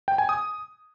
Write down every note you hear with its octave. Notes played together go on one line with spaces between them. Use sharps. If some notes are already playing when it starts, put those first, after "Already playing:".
G5
G#5
D#6